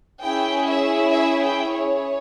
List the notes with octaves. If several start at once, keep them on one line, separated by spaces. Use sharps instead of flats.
C#4 E4 G#4 G5
E5
E5
G5
C#5